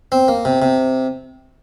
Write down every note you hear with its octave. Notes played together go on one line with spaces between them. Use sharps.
C4
A#3
C3
C3